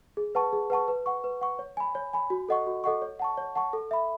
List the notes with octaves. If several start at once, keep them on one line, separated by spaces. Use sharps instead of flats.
G#4
B4 F#5 A5 C#6
G#4
B4 F#5 A5 C#6
B4
F#5 C#6
B4
F#5 C#6
C#5
G#5 B5
C#5
G#5 B5
F#4
A4 D#5 F#5 C#6
F#4
A4 D#5 F#5 C#6
C#5
F#5 A5 C#6
C#5
F#5 A5 C#6
A4
E5 B5